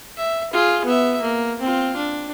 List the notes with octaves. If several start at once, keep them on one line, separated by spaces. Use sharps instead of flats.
E5
F4 G#4
B3 E5
A#3
C4 F4
D4